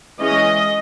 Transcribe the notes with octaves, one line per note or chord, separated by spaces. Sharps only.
E3 G#3 C#4 D#5